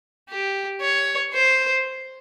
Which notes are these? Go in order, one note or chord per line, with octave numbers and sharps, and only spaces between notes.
G4
C#5
C5